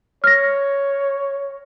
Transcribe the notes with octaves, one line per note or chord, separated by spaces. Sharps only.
C#5 F6 A#6